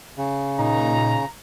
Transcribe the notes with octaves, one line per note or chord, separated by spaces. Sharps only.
C#3
A#2 D#4 A#5